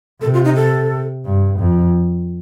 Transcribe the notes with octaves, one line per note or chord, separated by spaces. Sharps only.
C3 A4
F4
D#4
A4
G2
F2